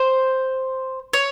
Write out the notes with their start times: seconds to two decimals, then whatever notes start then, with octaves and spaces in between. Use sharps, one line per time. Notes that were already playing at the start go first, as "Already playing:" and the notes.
Already playing: C5
1.13 C#5